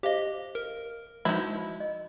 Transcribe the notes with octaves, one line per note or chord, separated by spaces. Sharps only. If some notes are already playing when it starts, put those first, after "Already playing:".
G4 C5 D#5 F5
A#4
F3 G#3 D#4 E4 F#4
D#5